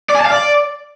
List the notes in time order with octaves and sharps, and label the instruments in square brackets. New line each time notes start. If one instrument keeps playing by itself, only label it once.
[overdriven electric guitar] D5
G#5
A5
F5
D5